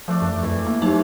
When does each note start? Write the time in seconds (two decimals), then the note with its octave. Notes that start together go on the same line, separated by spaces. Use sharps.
0.08 F3 A3 D4
0.22 F#2
0.43 F2 E3
0.66 A#3
0.82 F#3 D#4 G4